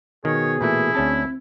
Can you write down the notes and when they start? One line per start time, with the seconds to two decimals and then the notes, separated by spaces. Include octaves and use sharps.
0.25 B2 D#3 G#4 C#5
0.61 A#2 E3 A3 E4
0.95 D2 C4 C#4 A5